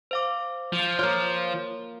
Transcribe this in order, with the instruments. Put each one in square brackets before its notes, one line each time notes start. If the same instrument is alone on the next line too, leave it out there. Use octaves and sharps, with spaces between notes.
[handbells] C5 F5 D6
[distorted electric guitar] F3
[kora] A#3 F4 [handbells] C#5